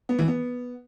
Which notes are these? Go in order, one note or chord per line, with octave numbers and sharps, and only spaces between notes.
B3
E3
B3